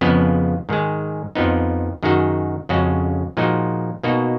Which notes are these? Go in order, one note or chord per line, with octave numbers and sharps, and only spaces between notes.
F2 C#3 F3 G#3 B3
G#2 D#3 G#3
F2 F3 B3 D#4
F#2 D#3 G#3 D#4 F#4
F2 C#3 G#3 C#4 F#4
A#2 F3 G#3 D#4 F#4
B2 A#3 D#4 F#4